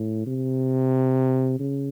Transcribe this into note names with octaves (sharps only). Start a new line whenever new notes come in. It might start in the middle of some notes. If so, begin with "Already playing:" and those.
Already playing: A2
C3
C#3